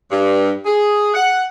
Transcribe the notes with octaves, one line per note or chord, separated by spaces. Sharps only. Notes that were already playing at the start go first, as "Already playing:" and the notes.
G2
G#4
F#5